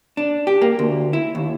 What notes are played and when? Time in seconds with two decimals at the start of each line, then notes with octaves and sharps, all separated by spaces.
0.17 D4
0.47 G4
0.61 A#3
0.79 D2
1.13 E4
1.35 D#2